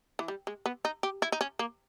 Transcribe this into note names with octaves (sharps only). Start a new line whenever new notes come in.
E3
G3
G#3
B3
D#4
G4
E4
D#4
C#4
A#3